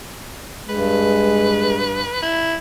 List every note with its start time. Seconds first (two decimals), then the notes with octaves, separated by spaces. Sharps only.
0.69 G2 G#3 B4
2.23 E4